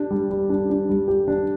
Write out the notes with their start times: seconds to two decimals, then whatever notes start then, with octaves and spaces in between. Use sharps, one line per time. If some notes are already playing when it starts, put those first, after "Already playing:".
Already playing: D4 G4
0.10 G3
0.30 G3
0.50 D4
0.70 D4
0.89 G3
1.08 G4
1.28 D4